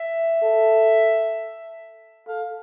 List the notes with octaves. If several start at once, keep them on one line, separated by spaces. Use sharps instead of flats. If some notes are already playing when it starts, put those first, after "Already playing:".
Already playing: E5
A4
A4 F5